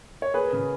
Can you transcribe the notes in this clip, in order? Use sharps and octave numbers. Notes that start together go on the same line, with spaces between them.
C#5
A#3 G#4 B4
C#3